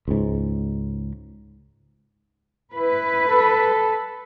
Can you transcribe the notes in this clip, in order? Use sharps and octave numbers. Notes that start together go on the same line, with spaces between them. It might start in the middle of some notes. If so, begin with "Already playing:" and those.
C#2 G#2
E4 B4
A4